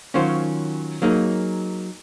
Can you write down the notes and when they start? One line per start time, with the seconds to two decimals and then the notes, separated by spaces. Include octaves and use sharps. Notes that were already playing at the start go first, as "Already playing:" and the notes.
0.14 D#3 F#3 C#4 F4 C5
1.02 F#3 A#3 D#4 G#4